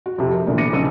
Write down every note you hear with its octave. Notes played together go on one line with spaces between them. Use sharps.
F#4
F2 C3
A#4
A#1 A#2 D3 E3
B3 D6 A#6 C#7 D#7
B1 C#3 D6 E6 D#7